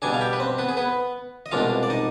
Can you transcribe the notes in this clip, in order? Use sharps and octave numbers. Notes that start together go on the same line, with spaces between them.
B2 G3 D4 G#4 G#5
F5
G4 G5
B4
C4 C5
B3 B4
G#4
B3 B4
D#5
C2 B2 G#3 D4 F4 F5
D5
D#4 D#5